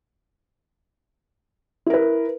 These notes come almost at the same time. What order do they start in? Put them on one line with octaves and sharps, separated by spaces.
E4 A#4 B4